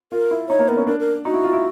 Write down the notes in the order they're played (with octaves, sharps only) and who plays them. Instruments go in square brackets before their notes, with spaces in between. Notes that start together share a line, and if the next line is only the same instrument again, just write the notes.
[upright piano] F4 [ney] A#4
[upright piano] E4
[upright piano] D#4 [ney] C#5
[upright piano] A#3
[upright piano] B3 [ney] A#4
[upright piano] C#4
[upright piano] D4 [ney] A#4
[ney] A#4
[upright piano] D#4 [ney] F#4
[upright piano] E4
F4
E4